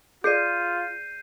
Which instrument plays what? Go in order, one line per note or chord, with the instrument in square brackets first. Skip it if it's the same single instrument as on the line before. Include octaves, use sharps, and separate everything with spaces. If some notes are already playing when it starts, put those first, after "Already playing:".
[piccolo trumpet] F4 [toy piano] G#4 D5 [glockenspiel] G6 C7 D#7